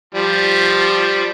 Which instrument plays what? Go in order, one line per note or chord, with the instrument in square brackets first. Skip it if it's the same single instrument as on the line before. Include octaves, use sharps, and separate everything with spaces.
[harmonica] F3 G3